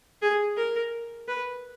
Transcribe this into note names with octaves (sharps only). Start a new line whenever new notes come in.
G#4
A#4
B4